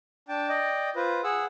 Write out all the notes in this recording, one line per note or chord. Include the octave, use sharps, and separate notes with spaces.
D4 G5 A5
D5 D#5 G5
F4 B4 C5
G#4 F#5 E6